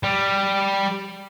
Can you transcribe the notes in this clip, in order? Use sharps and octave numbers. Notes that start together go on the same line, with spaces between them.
G3